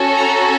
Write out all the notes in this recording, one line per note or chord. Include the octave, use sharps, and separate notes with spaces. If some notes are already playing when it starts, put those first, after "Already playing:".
Already playing: C#4 F#4 A4
A#5